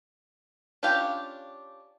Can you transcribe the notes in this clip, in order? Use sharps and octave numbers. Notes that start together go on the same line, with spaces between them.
C#4 D4 F4 G4 F5